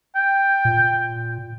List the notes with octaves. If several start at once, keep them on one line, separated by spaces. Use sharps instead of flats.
G5
A#2